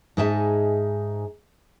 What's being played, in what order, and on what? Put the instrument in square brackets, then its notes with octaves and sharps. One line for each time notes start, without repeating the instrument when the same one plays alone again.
[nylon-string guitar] G#2 D#4 G#4 E5 G#5 A5